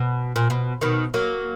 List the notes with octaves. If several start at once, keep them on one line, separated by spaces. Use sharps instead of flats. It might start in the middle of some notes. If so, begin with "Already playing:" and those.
Already playing: B2
A#2
B2
B2 D#3
F#3 A#3